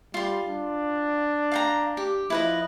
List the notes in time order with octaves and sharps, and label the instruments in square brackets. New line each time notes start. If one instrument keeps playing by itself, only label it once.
[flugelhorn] G3 [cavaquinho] F4 C6
[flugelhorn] D4
[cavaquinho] F5 G5 A#5
G4
[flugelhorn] F3 [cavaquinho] E4 B4 D#5